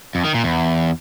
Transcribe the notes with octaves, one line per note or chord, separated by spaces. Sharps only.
F2
D#3
A#2
E2